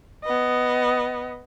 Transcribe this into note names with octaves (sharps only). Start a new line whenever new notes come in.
B3 D#5